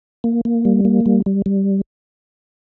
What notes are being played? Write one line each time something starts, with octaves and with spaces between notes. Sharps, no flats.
A#3
A#3
G3
A#3
G3
G3
G3